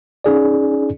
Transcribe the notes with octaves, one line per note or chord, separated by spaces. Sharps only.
C#4 D#4 G#4 D5